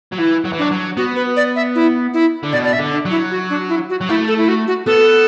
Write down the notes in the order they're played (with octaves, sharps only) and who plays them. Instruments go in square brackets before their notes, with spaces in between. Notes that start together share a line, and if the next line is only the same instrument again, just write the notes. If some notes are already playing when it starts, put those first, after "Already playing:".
[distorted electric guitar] F#3
[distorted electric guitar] E3 [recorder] E4
[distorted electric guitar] F#3
E3
[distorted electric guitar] F#3 [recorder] D4
[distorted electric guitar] F#3
[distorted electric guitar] B3 [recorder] F#4
[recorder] B4
D5
E5
E4
E4
[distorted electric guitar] D3
[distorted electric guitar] B2 [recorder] D5
[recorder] D5
E5
[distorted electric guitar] D3
[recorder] D4
[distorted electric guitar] F#3
[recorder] E4
F#4
D4
E4
F#4
[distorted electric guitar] F#3
[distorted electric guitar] A3 [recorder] E4
[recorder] A4
E4
F#4
F#4
[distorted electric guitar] B3 [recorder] A4